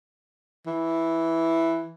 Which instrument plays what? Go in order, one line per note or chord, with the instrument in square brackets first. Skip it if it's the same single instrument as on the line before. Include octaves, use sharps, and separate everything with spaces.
[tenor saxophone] E3